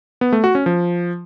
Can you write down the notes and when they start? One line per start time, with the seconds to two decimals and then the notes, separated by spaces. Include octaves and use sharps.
0.21 B3
0.32 A3
0.44 F#4
0.55 C#4
0.66 F3